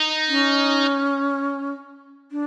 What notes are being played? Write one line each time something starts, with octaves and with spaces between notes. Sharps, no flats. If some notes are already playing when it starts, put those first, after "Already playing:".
Already playing: D#4
C#4
D4